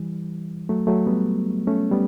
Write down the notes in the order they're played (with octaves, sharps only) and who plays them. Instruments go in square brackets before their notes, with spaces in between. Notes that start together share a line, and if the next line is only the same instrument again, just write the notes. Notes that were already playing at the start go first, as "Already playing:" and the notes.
Already playing: [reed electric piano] E3 G3
F#3 A3
F#3 A3
G3 B3
A3 C#4
G3 B3